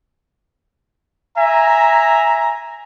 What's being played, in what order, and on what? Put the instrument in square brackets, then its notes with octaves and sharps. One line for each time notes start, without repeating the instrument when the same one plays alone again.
[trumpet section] E5 G#5 A#5